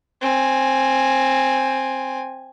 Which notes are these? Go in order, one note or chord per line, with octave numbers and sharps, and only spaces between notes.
C4 G#5